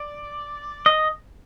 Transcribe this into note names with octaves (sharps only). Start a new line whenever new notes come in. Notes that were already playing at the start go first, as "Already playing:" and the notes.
Already playing: D5
D#5